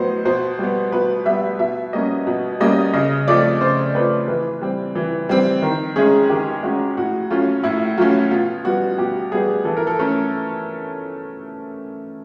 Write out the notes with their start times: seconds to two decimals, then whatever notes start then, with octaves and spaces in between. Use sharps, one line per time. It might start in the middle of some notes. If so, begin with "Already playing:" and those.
Already playing: A2 F#3 B3 C5 D#5
0.25 B2 C5
0.59 G3 B3
0.92 B2 B4
1.26 G3 B3 E5
1.59 B2 E5
1.93 G3 A#3 C#4 D#5
2.27 B2
2.60 G3 A#3 C#4 D#5
2.94 C#3 D#5
3.27 F3 A3 C4 D5
3.61 C#3 C5
3.95 F3 A3 C4 B4
4.28 E3 B4
4.61 G3 C4
4.95 E3
5.29 G3 C4
5.62 D#3
5.96 G#3 C#4 G#4
6.30 D#3 G4
6.63 G#3 C#4 F#4
6.97 A2 F#4
7.30 F#3 A3 C#4 F4
7.64 A2 E4
7.98 F#3 A3 C#4 F4
8.31 B2 F4
8.65 G3 B3 F#4
8.98 B2 G4
9.32 G3 B3 G#4
9.65 E3 A4
9.77 A#4
9.87 A4
9.99 A3 C#4 A#4